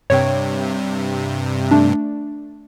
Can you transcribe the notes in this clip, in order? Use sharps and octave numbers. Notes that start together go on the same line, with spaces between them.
G2 C3 C#5 G5
A3 D4